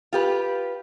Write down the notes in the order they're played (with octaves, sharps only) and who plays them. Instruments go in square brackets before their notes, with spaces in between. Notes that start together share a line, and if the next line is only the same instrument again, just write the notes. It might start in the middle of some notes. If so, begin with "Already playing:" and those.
[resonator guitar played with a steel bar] F4 G4 B4